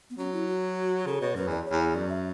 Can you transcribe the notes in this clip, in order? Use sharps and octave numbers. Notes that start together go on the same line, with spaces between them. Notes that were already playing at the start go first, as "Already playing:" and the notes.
B3
F#3 C#4
E4
F#4
C#3 A4
B2 C#5
F#2 B4
E2 D5
C#5
E2
F#2 D5
E5